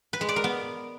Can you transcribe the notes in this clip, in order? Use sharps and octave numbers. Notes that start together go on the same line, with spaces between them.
B4
G#3
D5
A#4
B3